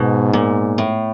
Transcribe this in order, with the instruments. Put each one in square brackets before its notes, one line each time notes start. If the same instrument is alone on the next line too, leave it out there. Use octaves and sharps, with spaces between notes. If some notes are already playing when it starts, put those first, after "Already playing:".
Already playing: [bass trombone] G#2 [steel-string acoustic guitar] B2
[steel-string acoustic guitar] A#2
A2